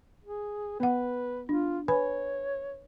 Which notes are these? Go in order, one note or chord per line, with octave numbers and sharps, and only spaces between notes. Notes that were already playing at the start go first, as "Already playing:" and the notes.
G#4
B3 B4 F#5
D4 F4
B4 C#5 G#5 B5